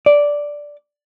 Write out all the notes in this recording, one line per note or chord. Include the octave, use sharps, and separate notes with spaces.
D5